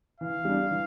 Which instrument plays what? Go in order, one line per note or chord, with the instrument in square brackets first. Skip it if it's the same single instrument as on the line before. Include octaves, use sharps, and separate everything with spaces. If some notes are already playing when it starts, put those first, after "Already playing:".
[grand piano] E3 [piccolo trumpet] F5
[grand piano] G3 D4
E3